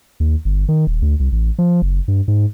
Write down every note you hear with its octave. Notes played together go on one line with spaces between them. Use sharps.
D#2
G1
D#3
D#1
D2
C2
A1
F3
F#1
G2
G#2